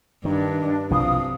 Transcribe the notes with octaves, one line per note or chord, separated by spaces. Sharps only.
G2 D#3 D4
B1 C3 E3 F3 F5 D#6